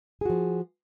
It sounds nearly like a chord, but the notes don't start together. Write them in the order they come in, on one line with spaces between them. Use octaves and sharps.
G#4 F#4 F3